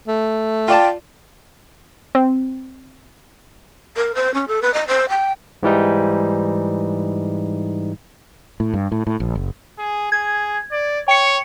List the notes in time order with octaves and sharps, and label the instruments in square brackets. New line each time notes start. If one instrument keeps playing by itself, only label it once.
[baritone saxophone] A3
[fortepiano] F4 D5 A5 [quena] G5
[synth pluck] C4
[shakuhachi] A#4
C5
C#4
A4
B4
D#5
C5
G5
[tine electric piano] G#2 E3 G3 D#4
[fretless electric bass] A2
G2
A2
A2
A#1
F#1
[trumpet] G#4
[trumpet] G#4 [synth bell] G#6
[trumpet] D5
[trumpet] C#5 [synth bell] G5 C#7